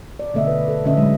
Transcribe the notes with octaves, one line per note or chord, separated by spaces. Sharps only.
D5
B2 D3 A3 D#5 E5
B4
A4
A#2 D3 A3 C#4 D#5 E5
F#3 G#3